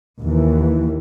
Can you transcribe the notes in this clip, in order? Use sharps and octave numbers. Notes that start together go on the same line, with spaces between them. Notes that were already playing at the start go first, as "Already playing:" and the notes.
D#2 E3